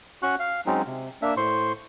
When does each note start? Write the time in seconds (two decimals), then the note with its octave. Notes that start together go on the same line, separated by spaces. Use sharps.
0.23 C#4 F#4 C#6 F#6
0.40 F5
0.66 F#3 G#3 C4 C#4 D#4
0.87 C3
1.22 A#3 D4 E5
1.37 A2 C5 C6 C#6